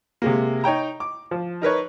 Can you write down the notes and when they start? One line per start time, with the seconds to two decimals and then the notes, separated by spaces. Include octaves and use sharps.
0.22 C3 G#3 A#3
0.64 D#4 C#5 G5 A#5
1.00 D6
1.31 F3
1.62 D#4 A#4 B4 C#5